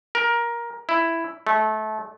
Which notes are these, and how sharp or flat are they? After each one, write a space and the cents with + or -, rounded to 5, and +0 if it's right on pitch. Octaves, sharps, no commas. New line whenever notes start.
A#4 +15
E4 +5
A3 -25